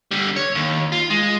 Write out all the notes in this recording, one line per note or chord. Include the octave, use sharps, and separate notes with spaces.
D3 G3
C#5
D#2
F4
G#3